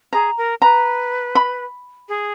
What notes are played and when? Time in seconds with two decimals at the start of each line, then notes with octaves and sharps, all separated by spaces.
0.13 G#4 A#5
0.38 A#4
0.62 B4 A#5
1.35 B5
2.09 G#4